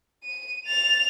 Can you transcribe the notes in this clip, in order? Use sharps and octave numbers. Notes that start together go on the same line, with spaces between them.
D#7
A6 F7